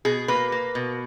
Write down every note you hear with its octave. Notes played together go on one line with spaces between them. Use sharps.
B2 G#4
A#3 B4
A#3
B2